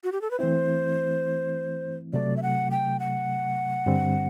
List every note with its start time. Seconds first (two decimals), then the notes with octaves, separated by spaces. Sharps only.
0.04 F#4
0.12 G4
0.21 A4
0.31 B4
0.39 E3 A3 C4 E4 C5
2.13 C3 F#3 A3 D5
2.37 E5
2.43 F#5
2.71 G5
3.00 F#5
3.86 G2 D3 G3 C4